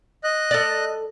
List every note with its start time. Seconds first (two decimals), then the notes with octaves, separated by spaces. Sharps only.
0.24 D#5 F#6
0.51 A4 D5